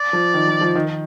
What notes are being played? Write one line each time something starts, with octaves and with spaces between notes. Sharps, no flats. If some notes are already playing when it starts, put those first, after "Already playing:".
Already playing: D5
F3
D#3
F3
F3
D#3